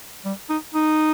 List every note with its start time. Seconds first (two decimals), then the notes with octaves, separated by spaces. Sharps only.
0.25 G3
0.50 D#4
0.74 D#4